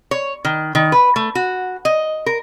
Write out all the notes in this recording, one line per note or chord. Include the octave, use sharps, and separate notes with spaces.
C#5
D#3
D#3
B4
A3
F#4
D#5
A#4